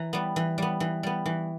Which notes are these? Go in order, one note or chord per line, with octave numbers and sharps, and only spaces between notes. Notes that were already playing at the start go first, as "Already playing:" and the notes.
Already playing: E3 A#5
G3 B3
E3
G3 B3
E3
G3 B3
E3